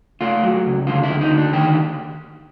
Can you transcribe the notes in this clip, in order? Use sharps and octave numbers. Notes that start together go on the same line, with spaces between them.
A3 F4
F#3
C#2
D3 F4
E4
D2
D#4
D3
D4
D#3 G4